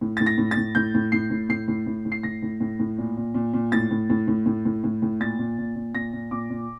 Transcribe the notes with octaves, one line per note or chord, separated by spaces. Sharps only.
A2
A2 A6
A#6
A2
A6
A2
A2 G6
A2
A2 C7
A2
A2 C7
A2
A2
A2
C7
A2 A#6
A2
A2
A2
A#2
A#2
A#2
A#2
A2 A6
A2
A2
A2
A2
A2
A2
A2
A#2 A6
A#2
A#2
A#2
A#2 A#6
A#2
A#2 D6
A#2